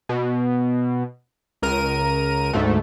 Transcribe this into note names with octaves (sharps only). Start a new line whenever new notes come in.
B2
C#2 A#4 D#7
D2 G#2 A3